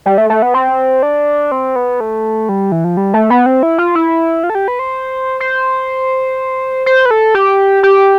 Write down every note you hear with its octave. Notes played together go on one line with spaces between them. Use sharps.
G3
A3
A3
B3
C4
D4
C4
B3
A3
G3
E3
F3
G3
A3
B3
C4
E4
F4
E4
F4
A4
G4
B4
C5
C5
C5
B4
A4
G4
G4